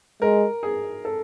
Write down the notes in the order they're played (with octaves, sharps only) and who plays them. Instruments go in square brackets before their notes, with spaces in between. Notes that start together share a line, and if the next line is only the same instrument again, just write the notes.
[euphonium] G#3 [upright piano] A#4
[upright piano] G#4
A4